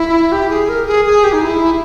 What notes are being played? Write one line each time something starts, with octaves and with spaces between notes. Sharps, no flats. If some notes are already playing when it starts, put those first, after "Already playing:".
Already playing: E4
G4
G#4
A#4
G#4
G#4
G4
D#4
E4